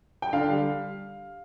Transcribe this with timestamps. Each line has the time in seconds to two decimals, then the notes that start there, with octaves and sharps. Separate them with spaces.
0.22 G5
0.33 D3 F5
0.50 G3